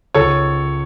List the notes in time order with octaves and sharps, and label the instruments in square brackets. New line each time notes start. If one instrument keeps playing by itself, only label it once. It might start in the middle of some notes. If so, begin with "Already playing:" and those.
[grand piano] C#2 A4 C#5